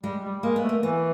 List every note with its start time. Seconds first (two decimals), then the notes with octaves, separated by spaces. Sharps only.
0.03 G3 G#3
0.23 G3
0.42 G#3 A#3
0.56 B3
0.63 A3
0.69 A#3
0.82 E3 B3